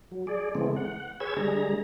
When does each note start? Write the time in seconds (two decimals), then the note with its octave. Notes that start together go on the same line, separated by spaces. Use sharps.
0.11 F#3
0.27 G#4 D5
0.55 C#3 E3 G#3 A3 B3 C4
0.76 F#5
1.20 G#4 B4 C#5 E6 G#6
1.37 D3 G3 G#3 G#4 A#5